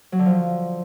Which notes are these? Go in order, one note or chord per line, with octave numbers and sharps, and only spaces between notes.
F#3
D3
F3